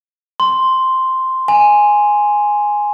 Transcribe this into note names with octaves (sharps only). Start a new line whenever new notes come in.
C6
G#5